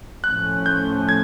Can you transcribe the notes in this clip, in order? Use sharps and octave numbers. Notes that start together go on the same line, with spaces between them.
A2 F3 A3 C#4 F#6
G6
G#6